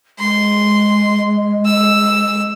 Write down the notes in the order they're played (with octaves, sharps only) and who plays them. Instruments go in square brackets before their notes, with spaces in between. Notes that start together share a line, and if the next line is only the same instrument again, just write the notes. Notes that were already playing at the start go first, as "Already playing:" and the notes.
[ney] G#3 [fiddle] C6
[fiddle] E6